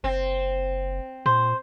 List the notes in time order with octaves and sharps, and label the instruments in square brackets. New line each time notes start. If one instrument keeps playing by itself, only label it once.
[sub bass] F#1 [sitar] C4
[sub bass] A#2 [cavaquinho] C5